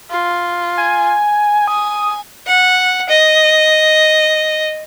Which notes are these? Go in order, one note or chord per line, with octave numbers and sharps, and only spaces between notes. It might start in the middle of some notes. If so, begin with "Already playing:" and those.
F4
G#5
G#5 D#6
F#5
D#5